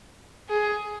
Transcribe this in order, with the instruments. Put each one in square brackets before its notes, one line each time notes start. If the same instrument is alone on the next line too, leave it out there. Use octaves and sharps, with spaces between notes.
[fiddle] G#4